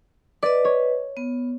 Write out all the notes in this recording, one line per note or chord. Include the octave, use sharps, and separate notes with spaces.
B4 D5 D#5
C#5
B3